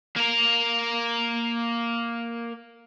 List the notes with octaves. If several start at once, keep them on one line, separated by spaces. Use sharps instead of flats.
A#3 A#4